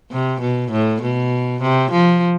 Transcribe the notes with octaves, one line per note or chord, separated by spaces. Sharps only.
C3
B2
A2
B2
C3
F3